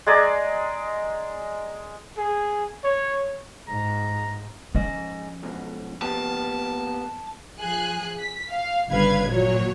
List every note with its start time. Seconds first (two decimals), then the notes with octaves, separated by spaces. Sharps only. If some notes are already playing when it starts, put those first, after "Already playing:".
0.07 G#3 G#4 D5 A#5
2.17 G#4
2.84 C#5
3.68 G#2 A#5
4.75 G#2 F3 C#4 D#5
5.43 B1 G#2 B2
6.02 A#3 B3 G4 A5
7.59 F3 G#4 G#5 F#6
8.19 B6
8.49 F5
8.90 G1 G2 C#3 B4 F5 G#6
9.27 A#2 F3 F#3 C#5